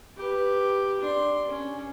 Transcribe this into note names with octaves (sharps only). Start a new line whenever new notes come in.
G4 B4
D4 C6
C#4